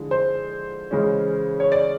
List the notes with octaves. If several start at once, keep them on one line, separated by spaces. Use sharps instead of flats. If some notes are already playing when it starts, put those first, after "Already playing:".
Already playing: D3 F3 G#3 E4
C5
C#3 E3 G#3 C#4
C#5
D5